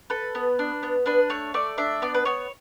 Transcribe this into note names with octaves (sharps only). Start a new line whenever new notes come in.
A4 B4
B3
D4
B3
D4 B4
A3 C#5
A3 D5
D4 E5
B3 D5
B4
B3 C#5